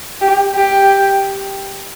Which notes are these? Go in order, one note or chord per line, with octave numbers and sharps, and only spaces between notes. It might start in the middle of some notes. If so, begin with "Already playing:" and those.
G4
G4